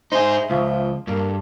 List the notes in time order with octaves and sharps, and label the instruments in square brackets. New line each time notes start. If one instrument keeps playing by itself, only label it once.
[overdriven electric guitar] D#4 G#4 [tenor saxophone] C5 [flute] E5
[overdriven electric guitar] C#2 [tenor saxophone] F3
[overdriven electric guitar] G2 [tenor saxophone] A#3 [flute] A4